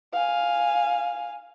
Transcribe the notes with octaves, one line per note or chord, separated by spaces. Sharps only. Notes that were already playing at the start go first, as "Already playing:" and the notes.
F5 G#5